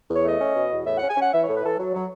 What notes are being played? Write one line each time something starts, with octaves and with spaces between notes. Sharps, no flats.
E2
C#5
A3 D#5
C#4
B2
E2
A2 E5
C#4 F#5
G#5
C#4 F#5
E3 E5
A2 C#5
B4
E3 A4
F#3
F#3